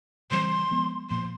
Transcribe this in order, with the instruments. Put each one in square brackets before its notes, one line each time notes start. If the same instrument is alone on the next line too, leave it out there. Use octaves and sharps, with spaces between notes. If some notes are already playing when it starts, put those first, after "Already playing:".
[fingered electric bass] C#3 E3 G3 C4 [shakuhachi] C6
[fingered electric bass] F3 G#3 B3
[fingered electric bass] A#2 F3 A#3 [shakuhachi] C6